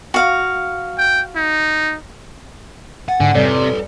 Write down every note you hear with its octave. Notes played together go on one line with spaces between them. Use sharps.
F#4 F5
G5
D#4
F#5 G#5 A6
G#2 D3 G#5
F2 C3 G3 A4 B4 C#5 D5 C#7